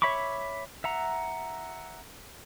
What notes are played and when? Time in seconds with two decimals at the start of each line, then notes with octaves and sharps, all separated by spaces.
0.02 C#5 E5 B5 C#6 D6
0.84 E5 F#5 A#5